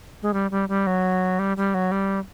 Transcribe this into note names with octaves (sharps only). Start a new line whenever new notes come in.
G#3
G3
G3
G3
F#3
G3
G3
F#3
G3